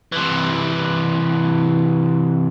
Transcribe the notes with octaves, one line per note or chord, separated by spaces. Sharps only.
C3 E3